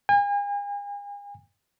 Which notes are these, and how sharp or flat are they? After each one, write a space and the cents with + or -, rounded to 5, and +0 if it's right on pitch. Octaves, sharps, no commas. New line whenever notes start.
G#5 -40